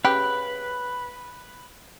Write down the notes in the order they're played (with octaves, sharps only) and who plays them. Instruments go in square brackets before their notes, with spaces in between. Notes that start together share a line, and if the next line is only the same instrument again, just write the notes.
[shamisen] C#3 G4 [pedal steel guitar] B4